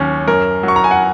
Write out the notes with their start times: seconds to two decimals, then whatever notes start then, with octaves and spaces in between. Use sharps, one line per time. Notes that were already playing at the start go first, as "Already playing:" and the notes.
Already playing: D#2 F#3 C#4
0.28 F#2 A#4
0.63 F#3
0.68 C#6
0.76 A#5
0.84 G#5
0.91 F#5